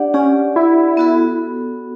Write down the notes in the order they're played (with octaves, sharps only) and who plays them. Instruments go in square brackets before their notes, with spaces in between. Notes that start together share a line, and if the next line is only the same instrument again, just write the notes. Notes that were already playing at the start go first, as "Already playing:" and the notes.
Already playing: [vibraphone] D4 G4 D5 F#5
[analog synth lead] C#4 [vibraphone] D4 G4 D5 F#5
[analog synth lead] E4
[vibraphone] B3 F#4 A4